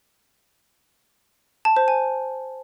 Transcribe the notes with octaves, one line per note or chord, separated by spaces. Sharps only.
A5
C5
G#5